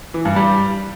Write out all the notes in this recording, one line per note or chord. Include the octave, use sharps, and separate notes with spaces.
E3
G2
G3